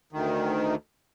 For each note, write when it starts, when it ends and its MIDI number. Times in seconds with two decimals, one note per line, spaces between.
0.12 0.75 38
0.12 0.75 51